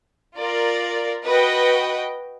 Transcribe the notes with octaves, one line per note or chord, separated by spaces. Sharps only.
F4 A#4 D5
F#4 B4 D#5 G5